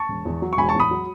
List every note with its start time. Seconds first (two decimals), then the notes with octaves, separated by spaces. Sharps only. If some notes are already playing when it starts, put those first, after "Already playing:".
Already playing: A5 C#6
0.09 E1
0.25 E2
0.42 F#3
0.53 C#6
0.58 E1 G#5 B5
0.69 A5 C#6
0.75 E2 B5 D#6
0.91 F#3